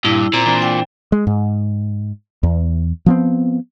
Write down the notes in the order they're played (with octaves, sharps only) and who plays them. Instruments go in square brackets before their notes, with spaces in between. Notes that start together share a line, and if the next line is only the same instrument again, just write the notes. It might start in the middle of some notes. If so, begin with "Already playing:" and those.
[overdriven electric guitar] G2 [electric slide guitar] A#2 [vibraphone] E4
[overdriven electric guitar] A#2 [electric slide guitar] C4 [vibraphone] A#5
[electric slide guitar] E3 C4 D4
[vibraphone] G5
[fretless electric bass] G#3
G#2
E2
F3 B3 C4